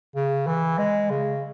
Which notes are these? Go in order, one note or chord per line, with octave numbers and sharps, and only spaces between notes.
C#3
E3
G#3
C#3